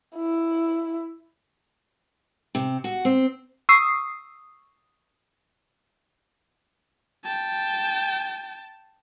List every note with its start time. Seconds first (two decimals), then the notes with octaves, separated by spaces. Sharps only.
0.16 E4
2.55 C3
2.84 F#4
3.05 C4
3.69 C#6 D#6 E6 C7
7.25 G5 A5